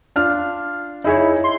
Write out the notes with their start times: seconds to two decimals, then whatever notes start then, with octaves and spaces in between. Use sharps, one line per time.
0.16 D4 F4 F6
1.04 D#4 E4 G#4 C#5
1.44 C6